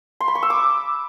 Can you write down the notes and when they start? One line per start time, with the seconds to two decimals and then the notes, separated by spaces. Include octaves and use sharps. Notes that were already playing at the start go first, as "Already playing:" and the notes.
0.20 C6
0.28 B5
0.35 C#6
0.43 E6
0.50 D6